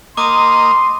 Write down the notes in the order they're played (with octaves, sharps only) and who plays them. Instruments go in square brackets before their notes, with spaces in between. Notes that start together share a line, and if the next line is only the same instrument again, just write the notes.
[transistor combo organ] A#3 D#5 [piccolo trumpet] C6 [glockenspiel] D6 D#6 D#7